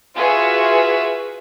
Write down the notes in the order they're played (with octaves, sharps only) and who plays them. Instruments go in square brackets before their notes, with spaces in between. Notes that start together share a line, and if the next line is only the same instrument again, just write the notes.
[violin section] F4 F#4 G#4 B4 E5 G#5